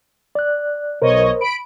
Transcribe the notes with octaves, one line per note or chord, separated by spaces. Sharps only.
D5 F#6
B1 A#4 C5 C#5 D#5
B5 D7